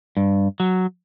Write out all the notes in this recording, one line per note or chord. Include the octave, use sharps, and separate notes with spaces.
G2
F#3